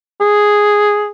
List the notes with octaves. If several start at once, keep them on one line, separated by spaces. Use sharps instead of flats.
G#4